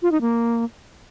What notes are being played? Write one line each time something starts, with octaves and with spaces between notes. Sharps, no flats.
F4
D#4
A#3